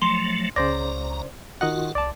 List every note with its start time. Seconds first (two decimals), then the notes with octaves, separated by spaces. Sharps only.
0.02 F3 F#3 A3 C6
0.56 C#2 C#3 C5 D5 A#5 A#6
1.61 D#3 F4 F#4 D#5 F#5
1.95 C2 D5 A5